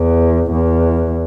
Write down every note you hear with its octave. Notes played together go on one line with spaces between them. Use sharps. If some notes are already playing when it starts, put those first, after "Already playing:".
Already playing: E2
E2